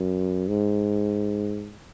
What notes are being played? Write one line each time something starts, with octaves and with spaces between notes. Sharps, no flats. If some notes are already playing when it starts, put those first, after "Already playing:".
Already playing: F#2
G#2